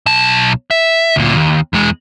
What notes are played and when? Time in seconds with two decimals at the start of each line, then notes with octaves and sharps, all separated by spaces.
0.06 B1 A5
0.71 E5
1.16 D2 A#2
1.36 D#2
1.73 E2 G#3